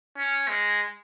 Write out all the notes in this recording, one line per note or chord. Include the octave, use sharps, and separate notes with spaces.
C#4
G#3